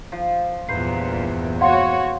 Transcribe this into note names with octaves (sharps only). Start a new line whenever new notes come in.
F3
E2 G2 A#2 B4 C5 A#5 C7
F#4 C#5 F5 F#5 C6